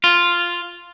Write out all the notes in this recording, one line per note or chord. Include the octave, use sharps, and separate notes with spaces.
F4